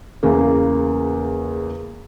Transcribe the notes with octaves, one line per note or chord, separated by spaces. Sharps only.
E2 C#3 A#3